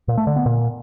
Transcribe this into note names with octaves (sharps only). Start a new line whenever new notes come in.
A#2
A3
D3
B3
A#2